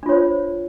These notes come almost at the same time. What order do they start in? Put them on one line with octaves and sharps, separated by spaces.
D4 F4 C#5 C5